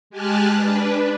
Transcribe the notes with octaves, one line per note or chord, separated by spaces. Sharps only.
G#3 G4 G#4 A5 F6 F#6
D4 B4